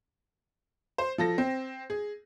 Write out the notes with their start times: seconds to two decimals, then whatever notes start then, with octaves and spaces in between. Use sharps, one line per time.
0.98 C5
1.18 F3 A4 A#6
1.38 C4
1.90 G#4